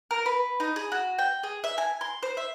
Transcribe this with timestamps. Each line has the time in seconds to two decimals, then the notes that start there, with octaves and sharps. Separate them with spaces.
0.11 A#4
0.26 B4
0.60 D#4
0.76 G#4
0.92 F#4
1.19 G5
1.43 G#4
1.64 E5
1.78 G#5
2.01 C6
2.23 C5
2.37 E5